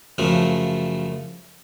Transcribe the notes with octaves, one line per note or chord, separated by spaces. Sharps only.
F#2 C#3 F3 A3